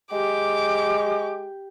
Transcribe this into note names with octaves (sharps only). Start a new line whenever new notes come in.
G#3 G4 D6